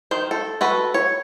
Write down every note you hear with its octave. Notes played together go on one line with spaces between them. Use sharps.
D#3 C5
A4
F#4 A4 B4
C#5